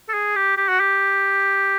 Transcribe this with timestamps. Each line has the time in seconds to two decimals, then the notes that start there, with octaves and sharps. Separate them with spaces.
0.09 A4
0.13 G#4
0.36 G4
0.57 G4
0.69 F#4
0.80 G4